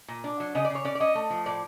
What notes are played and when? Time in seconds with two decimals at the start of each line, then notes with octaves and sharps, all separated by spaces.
0.08 A#2
0.24 D4
0.40 F#3
0.55 C#3 D#5
0.65 D5
0.70 C#3
0.75 C#5
0.85 C#4 D5
0.95 D5
1.00 C#4 D#5
1.15 A3
1.30 F3
1.46 A2 D5